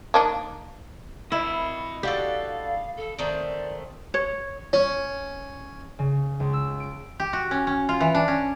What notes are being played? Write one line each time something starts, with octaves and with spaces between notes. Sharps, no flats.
A#3 D4 D#4
E4 D#5 B5
D4 F#4 G4 A4 F5
A4
D#3 A3 C4 D5
C#5
C#4
C#3
C#2
E6
D7
G4
F#4
C#4
C#4
F4
E3
D4
C#4